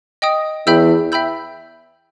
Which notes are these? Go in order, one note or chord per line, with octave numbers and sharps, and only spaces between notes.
D#5 G5 D#6
E2 E5 G5 B5 E6 G6
E5 G5 B5 E6 G6